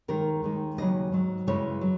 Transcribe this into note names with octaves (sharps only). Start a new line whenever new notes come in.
D#2 D#3 G#3 A#4
D#2 D#3 G#3
D#2 C#3 F#3 D#5
G#2 F#3
F#2 C#3 E3 G#3 C#5
F#3